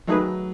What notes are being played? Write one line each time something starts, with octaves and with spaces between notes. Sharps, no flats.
D#3 F#3 A3 D#4 G#4 B4